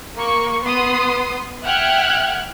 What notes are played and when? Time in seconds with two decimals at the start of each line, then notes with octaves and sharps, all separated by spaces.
0.16 A#3 C#6
0.64 B3 C6 D#6
1.65 E5 F#5 G5 F6 F#6 G#6